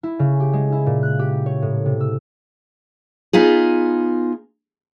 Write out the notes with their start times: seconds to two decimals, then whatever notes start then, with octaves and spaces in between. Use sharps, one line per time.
0.03 E4
0.19 C#3
0.40 G4
0.53 G#3
0.72 E4
0.86 A#2
1.03 F#6
1.19 G4
1.46 C#5
1.62 A2
1.86 C3
2.00 E6
3.33 B3 D#4 F4 G#4